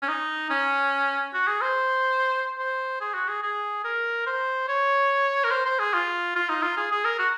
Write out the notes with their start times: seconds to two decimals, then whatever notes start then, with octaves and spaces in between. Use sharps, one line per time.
0.03 C#4
0.09 D#4
0.50 C#4
1.34 F#4
1.48 G#4
1.62 C5
2.59 C5
3.01 G#4
3.14 F#4
3.29 G#4
3.43 G#4
3.85 A#4
4.27 C5
4.68 C#5
5.44 A#4
5.51 C5
5.66 C5
5.79 G#4
5.94 F4
6.36 F4
6.49 D#4
6.63 F4
6.77 G#4
6.92 G#4
7.05 A#4
7.19 F#4